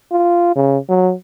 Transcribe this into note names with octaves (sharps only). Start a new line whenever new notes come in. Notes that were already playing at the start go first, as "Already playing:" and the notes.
F4
C#3
F#3